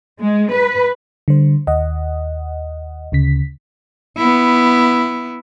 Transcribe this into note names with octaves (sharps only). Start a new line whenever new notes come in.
G#3
B4
D3 G3 C5
D#2 D#5 F#5
D2 C#3 B6
B3 E4